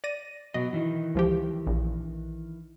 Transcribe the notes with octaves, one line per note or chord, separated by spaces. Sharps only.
D5 A#6 D#7
B2 F#3 D#5
D#3 E3
C#2 F3 G4
A#1